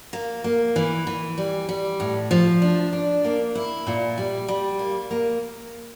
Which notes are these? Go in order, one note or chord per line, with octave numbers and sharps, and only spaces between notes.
A#3
A#3
E3
E3
G3
G3
A2
F3
D4
D4
A#3
E4
A#2
G3
G3
A#3
A#3